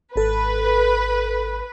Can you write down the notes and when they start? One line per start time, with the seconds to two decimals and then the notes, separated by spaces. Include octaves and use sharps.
0.16 G#1 A4 B4